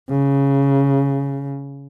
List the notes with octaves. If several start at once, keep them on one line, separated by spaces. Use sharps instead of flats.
C#3